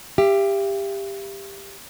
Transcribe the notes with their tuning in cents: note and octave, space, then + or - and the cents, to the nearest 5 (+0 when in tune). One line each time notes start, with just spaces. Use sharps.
G4 +15 E5 +45